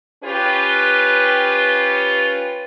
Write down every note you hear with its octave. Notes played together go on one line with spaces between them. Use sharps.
C#4 F4 G4 B4